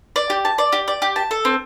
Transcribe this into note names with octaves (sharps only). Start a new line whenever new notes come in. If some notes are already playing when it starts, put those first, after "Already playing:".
D5
G4
A5
D5
G4
D5
G4
A5
A4
C4